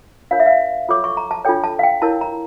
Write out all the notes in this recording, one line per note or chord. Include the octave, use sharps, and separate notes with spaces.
D4 F4 A#4 C#5 F5
E5
F5
F4 A4 C#5 D6
C#6
A#5
A5
D4 F4 A4 C#5 G5
A5
F5
G5
E4 A#4 C#5 A5
A#5